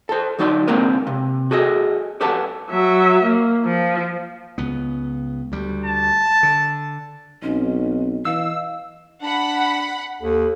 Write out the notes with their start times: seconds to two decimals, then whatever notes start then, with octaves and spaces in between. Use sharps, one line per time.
0.09 A4 C5
0.39 D2 F#3 D#4 D5 C6
0.68 G#2 D3 A#3 C4 A#4 B4
1.07 C3
1.51 F#4 G#4 A4 D#5
2.21 G4 A4 B4 E5 F#5 A5
2.70 F#3 E5
3.24 A#3
3.65 F3
4.58 C#2 B3
5.52 D2 G3
5.86 A5
6.43 D3
7.43 B1 C4 C#4 D#4 D#5
8.25 E3 B4 D#5 F5 E6
9.22 D4 F#5 B5
10.21 D#2 A4